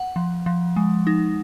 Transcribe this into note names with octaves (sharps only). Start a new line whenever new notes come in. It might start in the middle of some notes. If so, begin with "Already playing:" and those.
Already playing: F#5
F3
F3
G#3
D#4